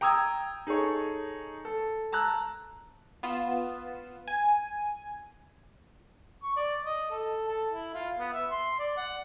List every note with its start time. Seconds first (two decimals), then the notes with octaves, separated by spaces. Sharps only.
0.01 G5 A#5 D#6 E6 G#6
0.67 D#4 G#4 A4 C#5
1.65 A4
2.12 A5 A#5 E6 F#6
3.23 B3 F4 E7
4.28 G#5
6.43 C#6
6.57 D5
6.85 D#5
7.11 A4
7.48 A4
7.71 E4
7.94 F4
8.19 B3
8.33 E5
8.51 C6
8.79 D5
8.97 F#5